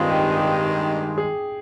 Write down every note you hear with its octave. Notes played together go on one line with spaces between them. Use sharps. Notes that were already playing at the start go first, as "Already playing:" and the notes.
Already playing: G2 D#3 G#3 C4 D#4 F4
G4
G4
G#4